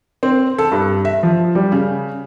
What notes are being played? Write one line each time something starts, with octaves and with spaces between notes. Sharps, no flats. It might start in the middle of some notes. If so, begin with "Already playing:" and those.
C4
A4
G2
E5
F3
G3
C#3